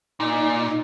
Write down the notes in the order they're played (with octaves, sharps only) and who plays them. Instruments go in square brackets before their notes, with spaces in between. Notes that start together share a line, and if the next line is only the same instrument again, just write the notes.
[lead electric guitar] A#2 [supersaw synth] D#4